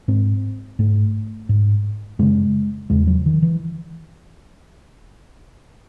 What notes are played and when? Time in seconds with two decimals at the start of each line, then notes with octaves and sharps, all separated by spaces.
0.08 G#2 C4
0.79 G#2 A3
1.49 G#2
2.19 F#2 C#3 G#3
2.90 E2 C#3 G#3
3.07 F#3
3.26 D#3
3.42 E3